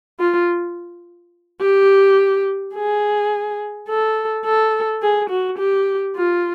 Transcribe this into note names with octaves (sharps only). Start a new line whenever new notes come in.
F4
G4
G#4
A4
A4
G#4
F#4
G4
F4